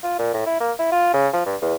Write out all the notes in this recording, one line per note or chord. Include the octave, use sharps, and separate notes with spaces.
F4
A#2
A2
E4
A#3
E4
F4
C#3
F3
G2
E2